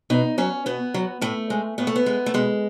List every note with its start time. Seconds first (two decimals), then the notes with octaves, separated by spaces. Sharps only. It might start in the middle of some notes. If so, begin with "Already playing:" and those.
0.10 B2 D#4
0.38 F#3 C#4
0.66 B2 B3
0.94 F#3
1.21 A2 A3
1.50 G#3
1.78 A2 B3
1.87 A3
1.96 B3
2.06 G#3
2.26 A3
2.34 B2 G#3